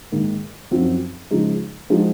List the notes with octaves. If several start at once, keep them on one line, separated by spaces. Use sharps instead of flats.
G#2 D#3 A#3
F#2 F3 C4 D#4 F#4
C#3 F3 G#3 D#4
F3 G#3 D#4 F#4